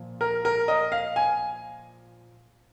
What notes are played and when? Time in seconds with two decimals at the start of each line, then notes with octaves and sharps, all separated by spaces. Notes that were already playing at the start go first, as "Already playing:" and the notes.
Already playing: A#2 F3
0.21 A#4
0.45 A#4
0.68 D#5
0.92 F5
1.16 G#5